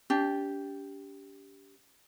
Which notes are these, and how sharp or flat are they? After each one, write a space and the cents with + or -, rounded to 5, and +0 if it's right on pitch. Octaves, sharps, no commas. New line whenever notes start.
D4 -45 G4 +0